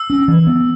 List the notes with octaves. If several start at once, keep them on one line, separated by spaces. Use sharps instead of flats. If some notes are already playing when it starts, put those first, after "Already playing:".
Already playing: E6
C#4
E3
B3